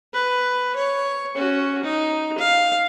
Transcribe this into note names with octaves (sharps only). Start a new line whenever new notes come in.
B4
C#5
C#4 F#4
D#4
F5